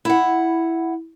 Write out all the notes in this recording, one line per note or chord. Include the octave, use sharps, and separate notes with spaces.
E4 F#5